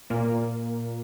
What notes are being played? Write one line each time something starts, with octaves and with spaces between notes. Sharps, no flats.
A#2 A#3